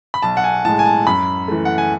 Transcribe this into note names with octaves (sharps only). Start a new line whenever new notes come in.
B5
B1 A5
F#5
G#5
A2 G#3 A5
G#5
A5
F#2 B5
E3 A3
F#5
G#5